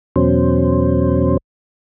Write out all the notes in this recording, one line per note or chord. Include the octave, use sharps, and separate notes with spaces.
E2 B2 F#3 C#4 C5